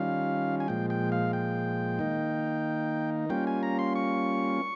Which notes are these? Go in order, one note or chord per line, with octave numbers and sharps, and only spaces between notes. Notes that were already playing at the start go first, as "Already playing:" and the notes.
Already playing: D#3 G3 C#4 F4 F5
G#5
A#2 F3 G#3 G5
G5
F5
G5
D#3 A#3 D#4
G3 A#3 C#4 F4 G5
G#5
A#5
C6
C#6